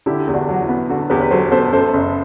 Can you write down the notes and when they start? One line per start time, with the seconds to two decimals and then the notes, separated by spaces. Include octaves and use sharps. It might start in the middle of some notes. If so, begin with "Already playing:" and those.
0.06 D3 E4 G4
0.27 E2
0.34 D4 F#4
0.49 F#3
0.54 F#4
0.62 E4
0.69 B3
0.89 D3 F#4 A4
1.10 E2 G4 B4
1.21 B4
1.31 F#3 A4 C5
1.52 B3 A4 C5
1.72 F#2 A4 C5
1.93 F#1